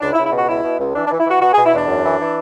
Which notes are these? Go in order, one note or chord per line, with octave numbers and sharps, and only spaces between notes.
C#2 D4
E4
C#2
E4
B2 F#4
C#2 E4
B2
C#2
E3 D4
D4
E3
E4
E3 F#4
B2 F#4
G#4
B2
E4
E2 D4
F#2
E3
E3